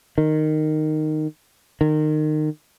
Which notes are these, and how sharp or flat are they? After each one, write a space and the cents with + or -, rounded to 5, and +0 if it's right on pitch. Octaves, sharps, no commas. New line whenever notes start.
D#3 -10
D#3 -25